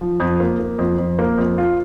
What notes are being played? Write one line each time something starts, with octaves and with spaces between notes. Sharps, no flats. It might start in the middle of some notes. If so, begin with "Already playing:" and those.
F3
F2
A#3
A#3
F2
F2
A#3
F2
F4